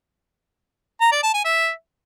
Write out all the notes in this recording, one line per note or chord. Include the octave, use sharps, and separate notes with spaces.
A#5
D5
A5
G#5
E5